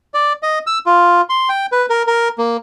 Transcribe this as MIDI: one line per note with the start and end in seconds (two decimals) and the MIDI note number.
0.14 0.33 74
0.43 0.59 75
0.67 0.78 88
0.86 1.21 65
1.29 1.49 84
1.49 1.66 79
1.72 1.86 71
1.90 2.03 70
2.07 2.28 70
2.38 2.57 58